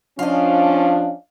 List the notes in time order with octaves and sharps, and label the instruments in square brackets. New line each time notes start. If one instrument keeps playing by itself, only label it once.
[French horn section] F3 C#4 D4 [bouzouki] D#5 F5